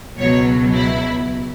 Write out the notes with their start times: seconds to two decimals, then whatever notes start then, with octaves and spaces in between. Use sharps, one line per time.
0.18 C#2 B2 F#3 C#5
0.75 E4